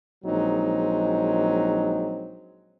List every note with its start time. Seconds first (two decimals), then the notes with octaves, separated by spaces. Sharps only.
0.25 A#1 F#3 G#3 C4 D#4